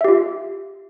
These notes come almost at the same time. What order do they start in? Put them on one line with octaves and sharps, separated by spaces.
E5 G4 F4